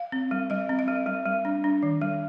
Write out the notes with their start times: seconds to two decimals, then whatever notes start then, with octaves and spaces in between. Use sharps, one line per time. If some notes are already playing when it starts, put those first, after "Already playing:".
Already playing: F5
0.12 C4
0.31 G3
0.50 G3 D#5
0.69 C4
0.79 D#5
0.88 G3
1.06 G3
1.26 G3
1.45 D4
1.64 D4
1.83 D#3
2.02 G3